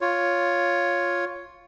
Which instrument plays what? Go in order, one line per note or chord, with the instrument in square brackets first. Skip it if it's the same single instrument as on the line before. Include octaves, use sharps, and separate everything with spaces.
[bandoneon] F4 C#5